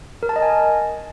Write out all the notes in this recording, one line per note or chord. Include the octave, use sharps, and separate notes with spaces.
A#4
A5
D#5
G#5